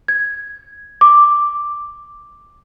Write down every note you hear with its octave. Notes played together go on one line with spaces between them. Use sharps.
G#6
D6